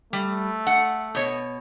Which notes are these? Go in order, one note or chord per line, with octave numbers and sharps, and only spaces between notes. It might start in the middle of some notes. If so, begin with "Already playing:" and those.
G3 A3
F#5
B2 C#5